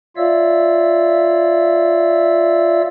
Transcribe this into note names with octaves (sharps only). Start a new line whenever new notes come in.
F4 C#5 D5 E5 F5 E6